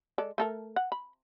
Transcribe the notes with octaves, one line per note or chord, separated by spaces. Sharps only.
G#3 A4 D5
A3 A4 A#4
F#5
B5